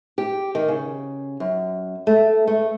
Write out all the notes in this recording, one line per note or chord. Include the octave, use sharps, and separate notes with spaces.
G4
D#3
C#3
F#2
A3
A3